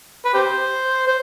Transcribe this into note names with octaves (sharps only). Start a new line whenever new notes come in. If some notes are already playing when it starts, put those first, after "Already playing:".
B4
G4 C5
C5